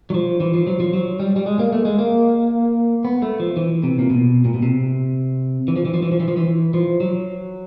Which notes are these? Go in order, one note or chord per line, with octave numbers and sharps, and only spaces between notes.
F#3
F3
E3
F3
F#3
F3
F#3
G3
G3
G#3
A#3
A3
G#3
A#3
B3
A3
F3
E3
C3
A#2
B2
A#2
B2
C3
E3
F3
E3
F3
E3
F3
E3
F3
E3
F3
F#3